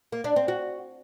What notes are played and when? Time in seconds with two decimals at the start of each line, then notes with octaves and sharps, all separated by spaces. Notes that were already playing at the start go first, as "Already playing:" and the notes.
0.12 A#3
0.24 D4
0.36 C4
0.48 F#4